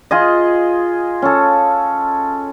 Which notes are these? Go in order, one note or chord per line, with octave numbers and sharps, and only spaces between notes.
F4 G#4 D#5
C#4 A4